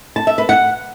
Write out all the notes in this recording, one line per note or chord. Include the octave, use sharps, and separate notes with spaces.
A5
E5
B4
F#5